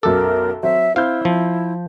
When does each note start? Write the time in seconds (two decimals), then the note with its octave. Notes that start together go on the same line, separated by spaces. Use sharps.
0.03 B1 F#2 A4 A#4 D6
0.63 F#3 C4 E5
0.96 C4 E4 F5 G6
1.25 F3